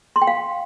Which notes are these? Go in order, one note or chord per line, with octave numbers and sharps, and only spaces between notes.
C6
G5
F5